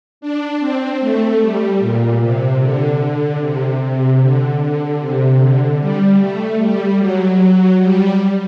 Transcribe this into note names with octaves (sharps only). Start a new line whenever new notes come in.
D4
C4
A3
G3
A#2
C3
D3
D3
C3
C3
D3
D3
C3
D3
G3
A3
G3
F#3
G3